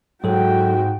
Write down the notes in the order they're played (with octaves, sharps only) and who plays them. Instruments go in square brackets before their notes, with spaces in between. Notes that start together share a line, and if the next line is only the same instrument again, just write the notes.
[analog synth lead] G#2 [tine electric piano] F#3 A4 [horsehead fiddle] F#4 G5